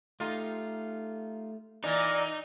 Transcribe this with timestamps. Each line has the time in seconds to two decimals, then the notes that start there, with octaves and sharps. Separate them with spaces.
0.20 A3 D#4 F4 G4
1.84 A#2 E3 D#4 D5